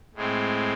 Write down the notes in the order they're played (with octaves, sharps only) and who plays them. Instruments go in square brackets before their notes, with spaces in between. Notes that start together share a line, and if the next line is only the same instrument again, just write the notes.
[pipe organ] A2 G#3 C4